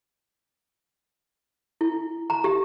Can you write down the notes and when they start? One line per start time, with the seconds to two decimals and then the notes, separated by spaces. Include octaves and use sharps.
1.81 E4
2.30 A#5
2.44 G4